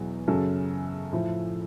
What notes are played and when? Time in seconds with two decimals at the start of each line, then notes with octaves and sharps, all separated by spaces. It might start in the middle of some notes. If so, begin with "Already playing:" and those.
Already playing: E2 B2 F#3
0.27 F#2 C#3 F#3 A4
1.12 A2 F3